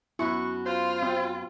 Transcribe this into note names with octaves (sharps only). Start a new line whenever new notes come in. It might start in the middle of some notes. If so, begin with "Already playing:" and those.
F#2 B3 E4 F#4 C#6
F4 C5
C4